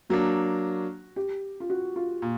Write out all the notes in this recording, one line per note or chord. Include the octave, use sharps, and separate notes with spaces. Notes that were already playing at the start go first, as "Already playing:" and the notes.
F#3 A#3 D4 F#4
G4
F4
F#4
F4
A#2